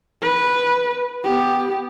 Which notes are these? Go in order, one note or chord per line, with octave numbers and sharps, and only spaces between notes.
B4
B3 G4